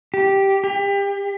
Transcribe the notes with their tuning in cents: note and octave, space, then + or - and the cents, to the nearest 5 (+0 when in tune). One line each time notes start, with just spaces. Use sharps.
G4 -5
G4 +30